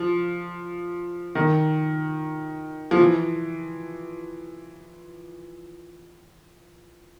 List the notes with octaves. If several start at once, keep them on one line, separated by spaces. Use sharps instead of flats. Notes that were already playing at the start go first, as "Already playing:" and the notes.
Already playing: F3
D#3
F3
E3